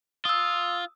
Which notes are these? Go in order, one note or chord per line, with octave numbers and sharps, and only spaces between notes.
F4 D#6 E6